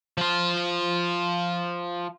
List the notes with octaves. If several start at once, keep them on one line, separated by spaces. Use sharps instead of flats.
F3 F4